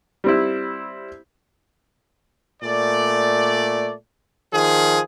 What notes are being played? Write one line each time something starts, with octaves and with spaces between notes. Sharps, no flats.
G3 C4 E4
A#2 A3 D5
D#3 F3 G#4